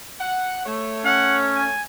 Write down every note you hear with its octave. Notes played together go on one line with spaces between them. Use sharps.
F#5
A3 C#5
C#4 F#5
G#5